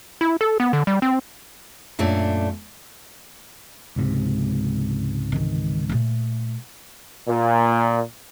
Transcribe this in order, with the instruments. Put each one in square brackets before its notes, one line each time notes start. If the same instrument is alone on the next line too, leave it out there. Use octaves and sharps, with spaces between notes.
[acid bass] E4
A4
B3
D3
G3
C4
[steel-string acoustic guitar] F#2 A#2 A3 D4
[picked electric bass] C#2 G#2 C3
[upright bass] D#3 E3
A#2 A3
[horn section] A#2